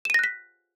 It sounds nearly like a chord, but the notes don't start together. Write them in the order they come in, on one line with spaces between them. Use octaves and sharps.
E7 D#7 A#6 F#6 B6